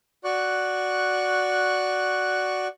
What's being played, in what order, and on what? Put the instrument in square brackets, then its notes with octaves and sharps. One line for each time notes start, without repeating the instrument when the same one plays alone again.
[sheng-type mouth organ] F#4 D5 C#6 F#6